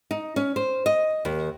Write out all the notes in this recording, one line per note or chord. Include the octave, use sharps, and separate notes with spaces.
D#4
C#4
C5
D#5
D#2